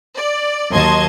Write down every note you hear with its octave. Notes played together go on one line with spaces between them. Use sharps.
D5
D#2 F#3 D#5 A5 C6 G#6